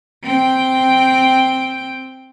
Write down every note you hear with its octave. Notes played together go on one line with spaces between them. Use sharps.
C4 G5